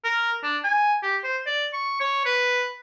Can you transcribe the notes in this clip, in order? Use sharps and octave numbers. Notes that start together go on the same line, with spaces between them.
A#4
D4
G#5
G4
C5
D5
C#6
C#5
B4